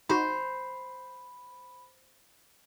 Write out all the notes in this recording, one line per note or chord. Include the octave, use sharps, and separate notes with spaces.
D#4 F#4 C5 B5